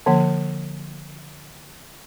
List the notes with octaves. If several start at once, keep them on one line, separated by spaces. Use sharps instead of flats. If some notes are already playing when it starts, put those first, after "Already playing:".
D3 F3 A#3